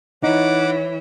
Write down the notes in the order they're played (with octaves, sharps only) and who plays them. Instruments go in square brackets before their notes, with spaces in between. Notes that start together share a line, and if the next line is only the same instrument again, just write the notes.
[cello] E3 [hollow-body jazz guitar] D#4 [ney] C#5 [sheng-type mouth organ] F#5 D6